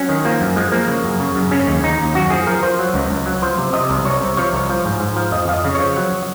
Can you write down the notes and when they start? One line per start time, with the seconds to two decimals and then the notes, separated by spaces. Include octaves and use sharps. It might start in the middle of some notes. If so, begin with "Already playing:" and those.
Already playing: F#3 C#4
0.09 D#3
0.25 F3 A#3
0.41 F#2
0.56 F3 G#3
0.72 F3 A#3
0.88 C#3
1.04 F#2
1.20 C#3
1.35 F#2
1.51 C#3 C#4
1.67 D#2
1.83 D#2 D#4
1.99 D#2
2.15 F#2 F#4
2.30 F3 G#4
2.47 F3 A#4
2.63 F3 C5
2.79 F#3
2.94 C#2
3.11 C#2
3.26 F#3
3.42 F3 C5
3.58 C3
3.73 C3 D#5
3.90 C2
4.05 C2 C#5
4.21 C3
4.37 F3 C#5
4.53 C2
4.69 F3
4.85 G#2
5.00 G#2
5.16 F3
5.32 F2 D#5
5.48 F2 F5
5.53 D#5
5.64 C#3
5.75 F3 C#5
5.96 F#3